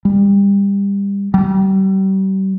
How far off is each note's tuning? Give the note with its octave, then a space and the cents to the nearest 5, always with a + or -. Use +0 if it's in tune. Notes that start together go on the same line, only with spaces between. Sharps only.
G3 +25
G3 -35